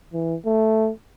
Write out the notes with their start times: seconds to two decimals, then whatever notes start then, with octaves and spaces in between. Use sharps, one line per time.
0.13 E3
0.46 A3